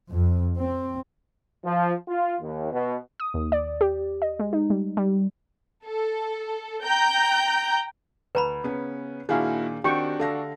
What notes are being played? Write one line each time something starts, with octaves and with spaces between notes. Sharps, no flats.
F2
C4
F3
F4
D#2
B2
D#6
D#2
D5
G4
D#5
G#3
D#4
G3
G3
A4
G5 A#5 G6
D2 B4 A#5 B5
C#3 B3 C#4
A#2 D#3 A#3 D4 E4 F#4 G#4 F5
D#3 C4 D4 F#4 G4 G5 C#6
D3 A4 F5 A#6